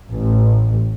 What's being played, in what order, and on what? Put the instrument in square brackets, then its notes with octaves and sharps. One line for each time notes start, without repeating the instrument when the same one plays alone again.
[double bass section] A1